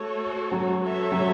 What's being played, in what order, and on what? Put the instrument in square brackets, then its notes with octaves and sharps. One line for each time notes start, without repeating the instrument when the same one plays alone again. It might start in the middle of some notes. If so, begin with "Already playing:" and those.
Already playing: [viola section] A3 F#4 A4 C#5
[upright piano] F#3
[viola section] B3 F#4 A4 C#5 E5
[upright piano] F#3